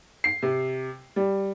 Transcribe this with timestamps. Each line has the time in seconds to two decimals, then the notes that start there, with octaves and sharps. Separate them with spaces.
0.24 C7
0.42 C3
1.16 G3